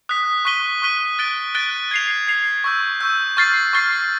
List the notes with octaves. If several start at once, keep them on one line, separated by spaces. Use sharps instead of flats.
D#6 F#6 B6
C#6 F#6 B6 D#7 G7
C#6 F#6 B6 D#7 G7
F#6 A6 D7 G7
F#6 A6 D7 G7
G#6 C7 F7
G#6 C7 F7
C#6 E6 G6
C#6 E6 G6
C#6 F6 A6 C7
C#6 F6 A6 C7